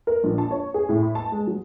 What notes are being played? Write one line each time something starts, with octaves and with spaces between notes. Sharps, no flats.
A#4
A#1
A5
C#5
G#4
A2
B5
A5
G#3
F#3